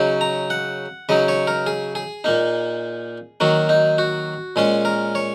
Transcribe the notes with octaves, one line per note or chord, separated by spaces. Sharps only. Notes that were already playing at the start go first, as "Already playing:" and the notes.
Already playing: C#3 F#3 D#4
A#5
F#5
C#3 F#3 D#4 D#5
C#5
A#4
G#4
G#4
A#2 A#3 D#4
D#3 F#3 A#3 F#4
D#4
F#4
A#2 G#3 C#4 G#4
A#4
C#5